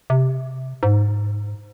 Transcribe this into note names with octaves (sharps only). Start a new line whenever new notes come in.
C3
G#2